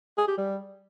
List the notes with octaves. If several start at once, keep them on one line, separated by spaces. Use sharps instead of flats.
G#4
G4
G3